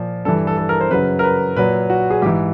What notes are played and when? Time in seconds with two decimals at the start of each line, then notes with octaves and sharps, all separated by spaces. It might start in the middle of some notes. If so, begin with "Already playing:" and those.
Already playing: A#2 F3
0.25 G2 E3 A4
0.47 A4
0.58 A4
0.69 A#4
0.81 C5
0.90 F#2 C#3 F#3 B4
1.19 A#4
1.23 B4
1.56 A#2 F#3 B4
1.90 F#4
2.10 G#4
2.22 G#2 E3 G4